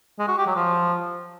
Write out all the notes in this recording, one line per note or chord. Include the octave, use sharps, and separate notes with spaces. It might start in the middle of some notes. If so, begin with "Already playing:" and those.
G#3
F#4
G4
F#3
F3